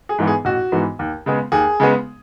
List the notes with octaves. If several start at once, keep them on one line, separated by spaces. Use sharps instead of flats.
G#4
G#2 E3 B3
G#4
A1 F#4
G#2 E3 B3
D#2
C#3 G#3 B3
D#2 G#4
C#3 G#3 B3